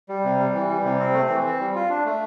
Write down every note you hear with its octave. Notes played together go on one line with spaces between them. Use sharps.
G3
C3
G3
E3
G3
C3
C4
A3
E3
C4
G3
F4
D4
A3